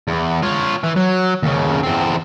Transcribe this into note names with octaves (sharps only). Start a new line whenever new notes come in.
E2
F4 C#5
E3
F#3
D#2 C#3
E2 C4